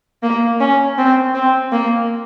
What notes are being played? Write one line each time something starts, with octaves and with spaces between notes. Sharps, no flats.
A#3
C#4
C4
C4
A#3